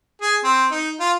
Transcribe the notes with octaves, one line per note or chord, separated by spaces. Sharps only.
G#4
C4
D#4
F4